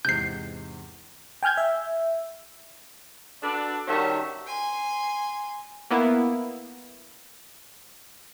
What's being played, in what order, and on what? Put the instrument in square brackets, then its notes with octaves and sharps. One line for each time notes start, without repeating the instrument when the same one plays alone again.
[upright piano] E2 G#2 C3 [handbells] G6 C7
[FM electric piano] G5 G#5 F6 G6 G#6
E5
[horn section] D4 F#4 A4 B4 D5
D#3 G3 C#4 F#4 E5 A5
[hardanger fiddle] G#5 C6
[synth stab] A#3 B3 E4